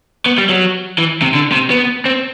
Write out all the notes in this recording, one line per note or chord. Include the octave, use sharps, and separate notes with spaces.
B3
G3
F#3
E3
C3
D3
C3
B3
C4